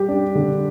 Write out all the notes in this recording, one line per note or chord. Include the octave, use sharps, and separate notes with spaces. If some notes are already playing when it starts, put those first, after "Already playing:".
Already playing: G3 G4
D4
D3